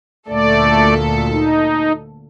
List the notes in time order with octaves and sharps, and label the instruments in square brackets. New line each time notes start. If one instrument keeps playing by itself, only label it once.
[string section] D2 A#2 A4 [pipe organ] A3 D5
[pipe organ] D#4